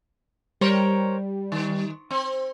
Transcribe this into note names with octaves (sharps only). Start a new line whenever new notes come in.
G3 A#4 C5 C#5
D#3
C4